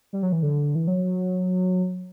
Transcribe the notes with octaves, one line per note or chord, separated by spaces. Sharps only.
G3
F#3
E3
D3
E3
F#3